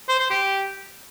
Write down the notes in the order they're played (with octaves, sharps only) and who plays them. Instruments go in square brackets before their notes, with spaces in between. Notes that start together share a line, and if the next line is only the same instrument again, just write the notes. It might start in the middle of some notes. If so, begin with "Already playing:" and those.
[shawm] C5
C5
G4